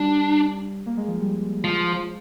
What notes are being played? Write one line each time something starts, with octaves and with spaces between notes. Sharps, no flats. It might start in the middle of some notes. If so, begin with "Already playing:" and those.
Already playing: G3 D4
A#3
G#3
F3
G3
F3 G#3